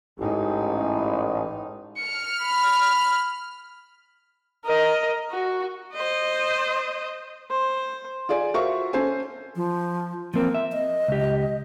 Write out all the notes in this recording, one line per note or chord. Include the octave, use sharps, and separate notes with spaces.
A1 G#2 D#4
F6 C#7
B5
A#4 D#5
F#4
C5 D#5
C5
F4 G#4 D5 G#5
F4 F#4 A#4 C5 E5 C#6
C#4 A4 C5 G#5
F3
F3 A#3 C4
E5
D#5
C#2 G4